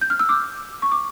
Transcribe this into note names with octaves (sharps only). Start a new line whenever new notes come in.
G6
F6
E6
D6
C#6
D6